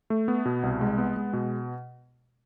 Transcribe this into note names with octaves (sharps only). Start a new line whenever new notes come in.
A3
B3
B2
C2
G#3
B3
G#3
B2